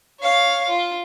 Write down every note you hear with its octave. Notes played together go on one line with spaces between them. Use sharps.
C#5 F5
F4